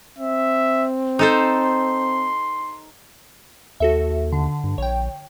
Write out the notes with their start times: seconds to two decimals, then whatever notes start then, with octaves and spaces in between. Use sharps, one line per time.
0.19 C4 E5
1.19 D#4 A4 C5 C6
3.80 D#2 F#4 A4 E5
4.32 D3
4.64 G2
4.78 A#1 C#5 G5